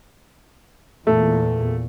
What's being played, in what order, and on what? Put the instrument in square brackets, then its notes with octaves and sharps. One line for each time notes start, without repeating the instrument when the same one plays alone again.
[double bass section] E2 A#2 [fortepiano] A3